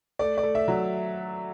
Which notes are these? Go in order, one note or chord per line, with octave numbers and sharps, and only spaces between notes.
A3 D5
D5
A3
E5
F#3